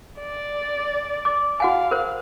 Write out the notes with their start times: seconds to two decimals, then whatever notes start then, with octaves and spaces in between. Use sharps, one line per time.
0.20 D5
1.25 D6
1.60 F#4 F5 F#5 G#5
1.91 A#4 C5